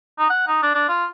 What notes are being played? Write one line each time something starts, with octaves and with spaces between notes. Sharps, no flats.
D#4
F#5
D#4
D4
D4
F4